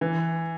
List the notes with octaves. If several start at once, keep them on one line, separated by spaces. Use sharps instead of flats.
E3